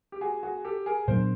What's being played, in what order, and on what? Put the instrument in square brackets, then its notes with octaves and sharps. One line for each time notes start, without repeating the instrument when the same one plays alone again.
[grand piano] G4
F#4 G#4
F#4 G#4
G4 A4
G#4 A#4
[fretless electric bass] A#2 F#3 B3 D4 [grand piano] A#4 C5